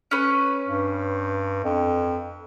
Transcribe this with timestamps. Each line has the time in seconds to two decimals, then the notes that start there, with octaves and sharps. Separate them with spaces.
0.11 C#4 B4
0.68 G2
1.64 F2